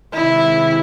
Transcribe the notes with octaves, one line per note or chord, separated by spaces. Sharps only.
C3 D#3 G#3 E4